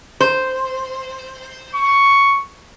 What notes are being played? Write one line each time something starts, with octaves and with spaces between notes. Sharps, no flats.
C5
C#6